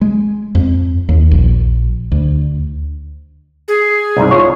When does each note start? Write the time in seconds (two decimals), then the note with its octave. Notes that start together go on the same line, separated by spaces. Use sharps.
0.01 G#3
0.55 F2
1.09 D#2
1.31 A#1
2.12 D2
3.68 G#4
4.17 C2 G#2
4.31 F4 C#5